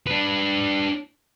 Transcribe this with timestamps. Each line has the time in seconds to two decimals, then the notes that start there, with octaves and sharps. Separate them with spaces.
0.07 D4 B4